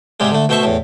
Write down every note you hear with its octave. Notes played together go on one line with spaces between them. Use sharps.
G#2 C3 G3 G#3
D3 A3
B2 A3 C5 E5 C#6
E2 A2